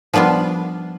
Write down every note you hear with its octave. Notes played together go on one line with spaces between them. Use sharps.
F3 G3 B3 D4 F4